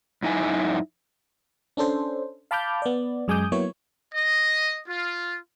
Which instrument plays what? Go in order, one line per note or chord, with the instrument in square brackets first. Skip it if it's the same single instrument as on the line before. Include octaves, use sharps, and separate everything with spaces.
[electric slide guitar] F#2 D#4 E4 G#5
[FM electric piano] C#4 D4 A4 C5
F5 A5 B5 D6 F6 G6
B3 D5
F#2 G#3 G#5 D6 D#6 G6
F#3 A#3 B3 E4 C#5
[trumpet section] D#5
F4